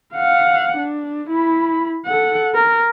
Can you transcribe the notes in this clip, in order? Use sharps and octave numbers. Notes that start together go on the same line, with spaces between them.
F5 F#5
D4
E4 B5
A4 F#5
A#4